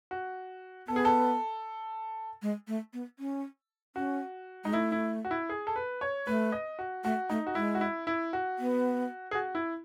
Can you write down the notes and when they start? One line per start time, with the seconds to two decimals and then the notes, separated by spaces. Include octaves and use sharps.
0.11 F#4
0.88 B3 A4
0.96 G#4
1.05 A4
2.42 G#3
2.68 A3
2.93 B3
3.19 C#4
3.96 C#4 F#4
4.64 G#3 D#4
4.73 A3 E4
4.92 E4
5.25 F#4
5.31 E4
5.49 G#4
5.67 A4
5.76 B4
6.01 C#5
6.27 A3 B4
6.52 D#5
6.79 F#4
7.04 A3 F#4
7.30 A3 D#4
7.47 F#4
7.55 G#3 E4
7.75 F#4
7.81 E4
8.07 E4
8.33 F#4
8.59 B3
9.31 G#4
9.35 F#4
9.55 E4